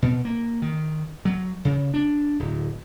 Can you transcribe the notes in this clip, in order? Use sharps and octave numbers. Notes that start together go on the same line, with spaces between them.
B2
A#3
D#3
F#3
C#3
D4
D1